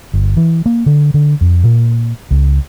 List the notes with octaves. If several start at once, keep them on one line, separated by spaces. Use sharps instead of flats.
G1
E3
A#3
D3
D3
F2
A#2
C#2